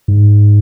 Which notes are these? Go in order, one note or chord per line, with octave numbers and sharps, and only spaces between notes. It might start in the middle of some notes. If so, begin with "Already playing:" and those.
G#2